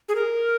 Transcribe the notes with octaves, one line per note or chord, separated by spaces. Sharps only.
G#4
A#4